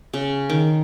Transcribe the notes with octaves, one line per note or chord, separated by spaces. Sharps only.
C#3
D#3